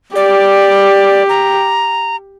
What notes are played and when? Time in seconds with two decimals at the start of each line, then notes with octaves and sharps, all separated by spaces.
0.15 G4 D5
1.29 A#5